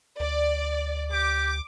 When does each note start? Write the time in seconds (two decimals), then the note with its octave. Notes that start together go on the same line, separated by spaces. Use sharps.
0.20 D2 D5
1.12 G4 D6